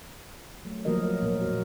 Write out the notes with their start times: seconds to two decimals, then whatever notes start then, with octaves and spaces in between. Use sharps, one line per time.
0.65 F#3 A3
0.85 F3 F#3 A#3 F#4 A#4 D#5
1.23 A#2 A#4
1.41 A#2 F#4